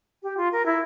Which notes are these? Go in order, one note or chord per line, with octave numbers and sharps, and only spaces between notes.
G4
F4
A#4
E4